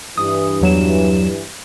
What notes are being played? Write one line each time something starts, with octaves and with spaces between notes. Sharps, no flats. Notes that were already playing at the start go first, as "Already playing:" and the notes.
G2 E3 D#6
E2 F#3 E7